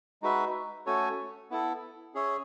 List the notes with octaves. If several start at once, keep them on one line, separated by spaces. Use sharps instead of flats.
G#3 D#4 F#4 B4 E5
A3 C#4 F#4 A4 C#5
B3 E4 A4
C#4 G#4 C#5 E5